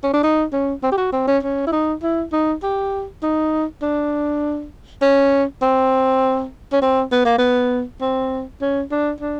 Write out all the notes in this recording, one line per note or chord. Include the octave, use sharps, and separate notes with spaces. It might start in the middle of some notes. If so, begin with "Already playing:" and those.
C#4
D4
D#4
C#4
C4
G4
F#4
C4
C#4
C#4
E4
D#4
E4
D#4
G4
D#4
D4
C#4
C4
C#4
C4
B3
A#3
B3
C4
C#4
D4
D4